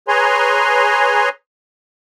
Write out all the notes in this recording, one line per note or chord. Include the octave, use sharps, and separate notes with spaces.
G#4 B4 C#5 G#5 A#5 C6